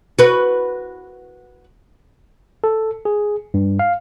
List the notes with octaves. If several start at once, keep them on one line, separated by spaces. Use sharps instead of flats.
F#4 B4
A4
G#4
G2
F5